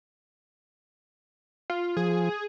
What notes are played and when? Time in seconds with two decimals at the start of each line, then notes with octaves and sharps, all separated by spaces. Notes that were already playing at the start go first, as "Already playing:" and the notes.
1.70 F4
1.97 F3 G#4